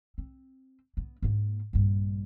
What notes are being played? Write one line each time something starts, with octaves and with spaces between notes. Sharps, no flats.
C4
B3
G#2 A#3
A#1 G2